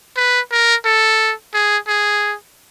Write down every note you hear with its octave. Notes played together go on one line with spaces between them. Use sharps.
B4
A#4
A4
G#4
G#4